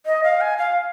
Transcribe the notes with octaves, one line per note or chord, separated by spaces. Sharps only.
D#5
F5
G#5
F5